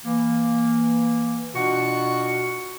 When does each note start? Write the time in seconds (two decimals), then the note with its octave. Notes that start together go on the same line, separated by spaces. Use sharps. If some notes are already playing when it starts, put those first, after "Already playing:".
0.04 E3 A#3
1.55 B2 D4 F4 F#4 F#5 C#6